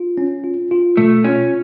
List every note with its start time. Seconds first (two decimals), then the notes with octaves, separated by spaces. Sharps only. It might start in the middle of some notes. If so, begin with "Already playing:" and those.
Already playing: F4
0.18 C#4
0.44 F4
0.71 F4
0.97 B2 A3
1.24 C#4 F4